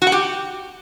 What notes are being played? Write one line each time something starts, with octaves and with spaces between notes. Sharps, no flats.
F#4
F#5
G4